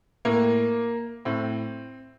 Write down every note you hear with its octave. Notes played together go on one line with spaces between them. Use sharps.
A2 A#3
A2 C4